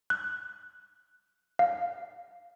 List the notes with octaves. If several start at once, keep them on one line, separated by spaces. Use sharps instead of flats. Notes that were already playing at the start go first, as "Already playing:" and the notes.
F#6
F5